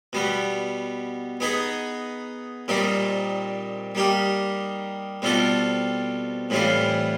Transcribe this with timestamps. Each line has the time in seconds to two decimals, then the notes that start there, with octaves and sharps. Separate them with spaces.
0.13 B2 G3 B3
1.40 B3 D#4 G#4 B4 D#5
2.68 A#2 G3 C4 D#4
3.95 G3 A#3 D#4 G4
5.22 B2 G3 C4 F4 A4
6.50 A2 E3 G3 C4 F4